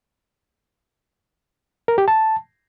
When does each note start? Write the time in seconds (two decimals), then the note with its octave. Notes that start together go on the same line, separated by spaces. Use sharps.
1.88 A#4
1.98 G4
2.08 A5